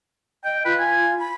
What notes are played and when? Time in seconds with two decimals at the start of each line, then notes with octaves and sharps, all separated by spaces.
0.45 D#5 G5
0.65 F4 B4
0.80 G#5
1.19 B5